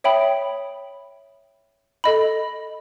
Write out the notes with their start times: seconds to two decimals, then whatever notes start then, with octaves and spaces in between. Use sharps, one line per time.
0.04 C#5 E5 G5 B5 D#6
2.04 A4 D#5 B5